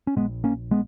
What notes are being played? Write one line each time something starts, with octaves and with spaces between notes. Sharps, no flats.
C#4
A#1 G#2 G#3 B3
A#3 C#4
G#3 B3